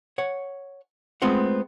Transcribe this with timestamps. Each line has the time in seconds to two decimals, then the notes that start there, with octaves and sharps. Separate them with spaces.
0.18 C#5 F#5
1.22 G#3 A3 B3 C4 F4 F#5